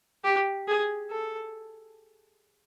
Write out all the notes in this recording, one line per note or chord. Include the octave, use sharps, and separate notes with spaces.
G4
G#4
A4